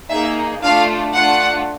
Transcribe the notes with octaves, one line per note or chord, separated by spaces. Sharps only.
A#3 D#4 G#4 E5
A3 D4 F4 F5
A3 D4 F4 F#5